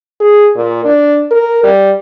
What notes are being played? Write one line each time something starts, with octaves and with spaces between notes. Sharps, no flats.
G#4
A#2
D4
A#4
G3